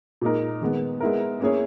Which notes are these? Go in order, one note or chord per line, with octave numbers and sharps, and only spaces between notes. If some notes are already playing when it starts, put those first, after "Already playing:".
A#2 G#3 D#4 A#4
D#3 G#3 B3
G#3 B3 E4 A#4
A#3 C#4 E4 G#4 C#5